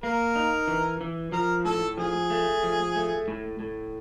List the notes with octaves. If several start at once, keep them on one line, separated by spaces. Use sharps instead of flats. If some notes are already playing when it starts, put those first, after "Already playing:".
A#3 A#4
D#4
E3
E3
F3 A#4
A2 A4
F3 G#4
A3
F3
A3
A2
A2